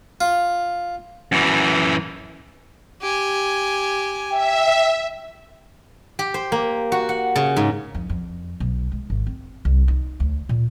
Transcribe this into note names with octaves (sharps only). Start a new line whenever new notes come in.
F4
F#2 E3
G4 G#5
E5 G5
G4
C5
A#3
F#4
F#5
C#3
G#2
F2
F2
B1
G#3
G#1
C4
C2
D#4
D2
A#2